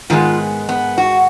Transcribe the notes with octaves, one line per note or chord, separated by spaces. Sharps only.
G#2 D#3 G#3 B3 F4
B3
F#4